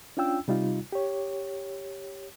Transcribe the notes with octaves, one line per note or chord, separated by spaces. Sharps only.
C#4 D4 F4 G5 E6
C3 G3 D#4 F4
G4 C#5